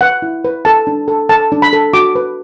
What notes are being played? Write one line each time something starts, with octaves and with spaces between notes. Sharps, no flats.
B4 F#5
E4
B4
A4 A5
D4
A4
A4 A5
D4
B5
A4
F#4 D6
B4